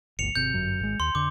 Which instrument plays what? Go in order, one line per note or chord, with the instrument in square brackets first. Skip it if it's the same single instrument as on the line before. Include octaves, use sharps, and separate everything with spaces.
[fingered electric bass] G1 D2 [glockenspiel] C#7 F7
[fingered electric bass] G#1 C3 [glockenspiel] G6
[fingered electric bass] G1 F#2 F#3
G#1 G#3
[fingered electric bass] D#2 [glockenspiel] C6
[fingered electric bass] F2 D3 [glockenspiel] D6